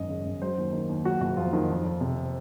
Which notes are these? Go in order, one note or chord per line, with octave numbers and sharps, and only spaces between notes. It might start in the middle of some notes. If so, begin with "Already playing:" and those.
Already playing: G#1 F#2 D#5
C#3
F#2
F#3 C5
D#2
D#3
D#2
F#3 F#4
F#1 F#4
F2 F4
D#3
F2
F2
C3